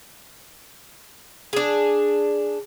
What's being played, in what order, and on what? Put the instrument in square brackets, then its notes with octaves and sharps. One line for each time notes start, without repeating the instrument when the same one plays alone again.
[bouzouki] D4 G#4